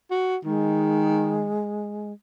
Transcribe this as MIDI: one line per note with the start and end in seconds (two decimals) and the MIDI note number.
0.11 0.36 66
0.44 1.55 51
0.44 2.12 56